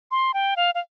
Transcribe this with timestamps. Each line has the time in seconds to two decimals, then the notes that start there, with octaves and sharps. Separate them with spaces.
0.11 C6
0.34 G5
0.57 F5
0.75 F5